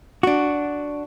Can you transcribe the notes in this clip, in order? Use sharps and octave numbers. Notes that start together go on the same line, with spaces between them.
D4 F#4